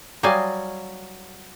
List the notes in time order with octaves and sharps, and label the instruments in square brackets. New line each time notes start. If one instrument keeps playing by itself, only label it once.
[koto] F#3 G3 D#5 F5 G#5